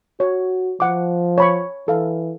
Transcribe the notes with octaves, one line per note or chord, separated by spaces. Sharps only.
F#4 C#5
F3 F#5 D6
C#5 B5 C#6
E3 A4 F5